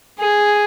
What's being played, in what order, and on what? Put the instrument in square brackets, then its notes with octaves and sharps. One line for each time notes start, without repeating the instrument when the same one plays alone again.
[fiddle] G#4